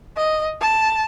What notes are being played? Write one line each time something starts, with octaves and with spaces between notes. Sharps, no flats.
D#5
A5